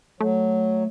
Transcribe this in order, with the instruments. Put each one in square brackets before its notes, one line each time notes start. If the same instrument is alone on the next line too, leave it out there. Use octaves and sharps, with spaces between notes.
[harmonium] F#3 [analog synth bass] A3